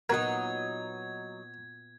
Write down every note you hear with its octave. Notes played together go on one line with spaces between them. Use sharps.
A#2 F#3 B3 D#4 F#4 A#4 F#5 G#6